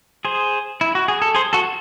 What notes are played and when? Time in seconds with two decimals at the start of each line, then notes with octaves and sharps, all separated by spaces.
0.25 G#4 C5
0.81 E4
0.95 F#4
1.08 G#4
1.22 A4
1.35 G#4 C5
1.53 F#4 A4